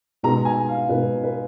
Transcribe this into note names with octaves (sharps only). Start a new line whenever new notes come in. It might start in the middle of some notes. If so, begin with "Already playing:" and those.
B2 G#3 B3 D#4 A#5
G#5
F5
B2 G#3 B3 D#4 B4
B4